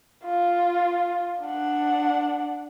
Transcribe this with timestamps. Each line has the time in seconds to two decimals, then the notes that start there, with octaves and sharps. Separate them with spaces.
0.24 F4
1.43 D4 F#5